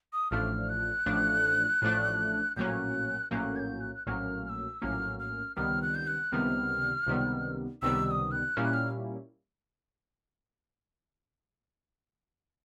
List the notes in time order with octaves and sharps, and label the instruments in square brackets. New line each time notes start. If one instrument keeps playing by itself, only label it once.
[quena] D#6
[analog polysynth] A1 A2 F3 A3 D4 [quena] F6
[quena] F#6
[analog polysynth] A1 A2 F3 A3 D4
A1 A2 F3 A3 D4
[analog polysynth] A#1 A2 F#3 A#3 C#4 [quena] F#6 G6
[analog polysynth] A#1 A2 F#3 A#3 C#4 [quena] F#6 G6
[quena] G#6
G6
F#6
F#6
[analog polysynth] A#1 A2 F#3 A#3 C#4 [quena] F6
[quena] F6
E6
[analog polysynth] A#1 A2 F#3 A#3 C#4 [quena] F6
[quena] F6
[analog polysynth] C#2 C3 D#3 G3 B3 [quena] F6
[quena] F#6
G6
F#6
[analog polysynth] C#2 C3 D#3 G3 B3 [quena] F6
[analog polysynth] C#2 C3 D#3 G3 B3
[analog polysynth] C#2 C3 D#3 G3 B3 [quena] E6
[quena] E6
D#6
F#6
[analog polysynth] A#2 G3 A#3 C#4 E4 [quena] F6
[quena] F#6
F6